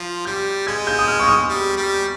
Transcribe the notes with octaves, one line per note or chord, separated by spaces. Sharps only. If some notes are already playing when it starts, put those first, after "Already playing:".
Already playing: F3
G3 G6
G#3 G#6
G6
D#6
F6
C#6
D#6
G3
G3